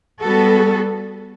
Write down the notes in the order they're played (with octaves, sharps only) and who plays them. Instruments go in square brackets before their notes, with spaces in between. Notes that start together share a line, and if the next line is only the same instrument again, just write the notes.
[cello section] G3 B3 F#4 A4